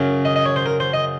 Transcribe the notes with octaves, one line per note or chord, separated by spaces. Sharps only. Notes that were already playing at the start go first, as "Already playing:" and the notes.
Already playing: F#2 C#3 F#3
D#5
D#5
C#5
C5
A#4
C5
D#5